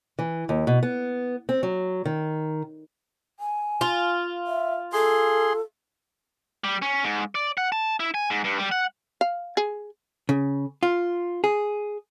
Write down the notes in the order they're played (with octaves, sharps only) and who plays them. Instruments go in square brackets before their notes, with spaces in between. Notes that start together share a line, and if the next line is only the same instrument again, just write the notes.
[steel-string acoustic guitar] E3
D#2
B2
B3
C4
F#3
D#3
[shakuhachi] G#5
[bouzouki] F4
[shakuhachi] E5
[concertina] G#4 C6 [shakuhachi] A4
[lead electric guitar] G3
C#4
G#2
D5
F#5
A5
E4
G#5
G#2
G2
G3
F#5
[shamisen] F5
G#4
[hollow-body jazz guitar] C#3
F4
G#4